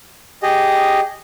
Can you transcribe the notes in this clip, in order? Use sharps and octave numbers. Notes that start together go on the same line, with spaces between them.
G4 G#4 D#5